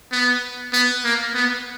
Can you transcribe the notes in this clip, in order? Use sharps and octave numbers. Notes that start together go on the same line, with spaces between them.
B3
B3
A#3
B3